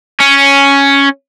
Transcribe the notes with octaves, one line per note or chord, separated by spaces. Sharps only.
C#4